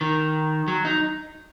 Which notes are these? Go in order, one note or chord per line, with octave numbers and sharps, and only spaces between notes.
D#3
F#3
D#4